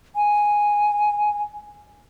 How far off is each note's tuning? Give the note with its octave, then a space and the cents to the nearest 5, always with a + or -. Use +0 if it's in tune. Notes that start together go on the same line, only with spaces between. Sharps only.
G#5 +0